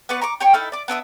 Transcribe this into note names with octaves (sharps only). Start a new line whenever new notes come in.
B3 B4 D5 C#6
A#5 C#6 D6
G4 C#5 C#6
D#4 E4 A4 F6
D5 D6
B3 D4 E5 D#6